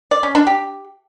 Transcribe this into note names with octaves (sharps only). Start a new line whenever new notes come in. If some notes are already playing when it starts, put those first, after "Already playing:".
D5
C#4
D4
G4